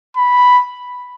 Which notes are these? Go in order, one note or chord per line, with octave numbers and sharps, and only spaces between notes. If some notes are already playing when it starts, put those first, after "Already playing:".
B5